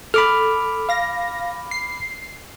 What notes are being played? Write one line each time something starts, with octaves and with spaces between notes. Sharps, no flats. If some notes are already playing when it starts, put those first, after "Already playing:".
A4 B5 D6 F6
F5 A#6
C7